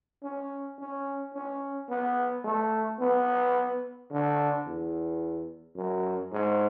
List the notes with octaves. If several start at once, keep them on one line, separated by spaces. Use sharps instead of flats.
C#4
C#4
C#4
B3
A3
B3
D3
E2
F#2
G#2